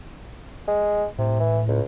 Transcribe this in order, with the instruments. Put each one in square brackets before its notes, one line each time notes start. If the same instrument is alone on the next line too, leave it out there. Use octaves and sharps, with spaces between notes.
[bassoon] G#3
[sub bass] A2 [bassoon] C3
[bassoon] E3
C#2